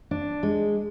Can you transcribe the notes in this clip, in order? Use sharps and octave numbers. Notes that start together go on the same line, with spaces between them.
D4
G#3